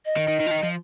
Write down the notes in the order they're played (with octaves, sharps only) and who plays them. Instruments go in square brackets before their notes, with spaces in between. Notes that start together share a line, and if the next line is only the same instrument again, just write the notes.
[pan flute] D#5
[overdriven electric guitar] D#3
D#3
D#3
F3
D#3
F3